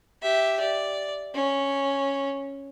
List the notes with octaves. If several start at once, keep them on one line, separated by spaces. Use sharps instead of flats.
G4 E5
D5
C#4